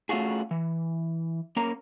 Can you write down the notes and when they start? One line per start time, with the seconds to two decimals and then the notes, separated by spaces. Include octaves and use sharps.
0.09 A3 C#4 F4 F#4 G#4
0.51 E3
1.57 A#3 C#4 A#4 A#5